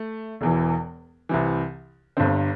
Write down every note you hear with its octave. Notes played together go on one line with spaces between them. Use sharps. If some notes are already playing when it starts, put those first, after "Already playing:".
Already playing: A3
E1 E2 E3
C2 C3 E3
G1 G2 D3 C4